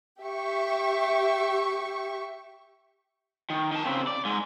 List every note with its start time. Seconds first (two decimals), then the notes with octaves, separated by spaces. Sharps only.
0.24 G4 E5 C#6
3.50 D#3
3.72 D#3 A5
3.85 C#3 C4
4.07 D5
4.25 G#2 G#3